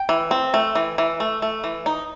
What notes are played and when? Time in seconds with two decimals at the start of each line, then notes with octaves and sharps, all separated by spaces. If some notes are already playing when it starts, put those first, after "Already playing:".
Already playing: G5
0.09 E3
0.31 C4
0.54 A3
0.75 E3
0.98 E3
1.20 A3
1.42 A3
1.64 E3
1.86 D#4